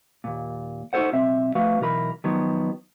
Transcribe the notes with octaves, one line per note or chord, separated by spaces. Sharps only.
D#2 A#2
D#4 F#4 G#4 A4 C5 F#5
B1 C4 E5
F3 A3 F#4 B4 F5
B1 E3 A#4 B5
D#3 F3 F#3 B3